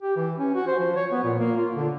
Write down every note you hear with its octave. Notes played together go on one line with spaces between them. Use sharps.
G4
E3
C#4
F#4
C5
F3
C#5
B3
A#2
A#3
F4
D3